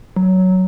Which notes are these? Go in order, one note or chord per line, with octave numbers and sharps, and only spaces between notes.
F#3